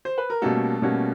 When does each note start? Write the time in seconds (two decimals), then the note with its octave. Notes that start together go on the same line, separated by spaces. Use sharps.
0.05 C5
0.18 B4
0.30 A#4
0.42 B2 G3 A3 A#3 C#4 F#4 A4
0.82 B2 G3 A#3 C#4 F#4